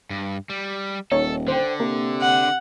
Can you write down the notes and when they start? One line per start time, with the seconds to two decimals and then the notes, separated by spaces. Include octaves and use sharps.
0.10 G2
0.50 G3
1.12 D#1 D#4 A4 C#5
1.48 D3 C5 G5
1.80 C3 A#3
2.21 F#5